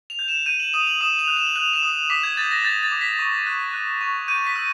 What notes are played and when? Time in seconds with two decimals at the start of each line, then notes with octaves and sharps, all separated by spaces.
0.10 F7
0.19 G6
0.28 E7
0.46 G6 D#7
0.60 F#7
0.74 D#6 F7
0.87 F#7
1.01 D#6 E7
1.19 F7
1.28 F#6
1.37 E7
1.47 F#7
1.56 F#6 F7
1.73 E7
1.82 D#6
1.92 F7
2.10 D6 B6
2.23 G#6
2.37 G6 A6
2.51 A#6
2.64 G6 A6
2.83 A6
2.91 D6
3.01 B6
3.19 C#6
3.46 F#6
3.73 F#6
4.01 C#6
4.28 G6 D#7
4.47 B6
4.55 E6